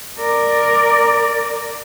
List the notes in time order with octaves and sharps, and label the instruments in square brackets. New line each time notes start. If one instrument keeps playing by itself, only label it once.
[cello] A#4 D5